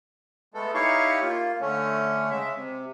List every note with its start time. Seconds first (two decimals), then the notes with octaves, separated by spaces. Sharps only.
0.54 G#3 A3 B3 A4
0.74 D#4 E4 G4 C#5 F5 C#6
1.22 A#3 F4
1.61 D3 A3 C#4
2.30 C#3 G#3 E5
2.55 C3